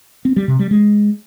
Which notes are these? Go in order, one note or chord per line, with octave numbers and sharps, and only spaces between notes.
C4
G3
C3
G3
G#3